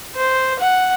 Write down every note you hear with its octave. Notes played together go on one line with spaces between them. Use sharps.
C5
F#5